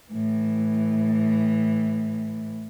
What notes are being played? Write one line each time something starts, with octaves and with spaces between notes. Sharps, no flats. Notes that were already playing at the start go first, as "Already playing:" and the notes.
A2 E3